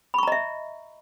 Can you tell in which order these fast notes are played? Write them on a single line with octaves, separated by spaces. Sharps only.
B5 C#6 A#5 D#5 E5